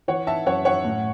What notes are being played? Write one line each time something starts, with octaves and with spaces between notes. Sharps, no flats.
E3 C#5 F#5
E5 A5
F#2 C#5 F#5
C#5 F#5
A2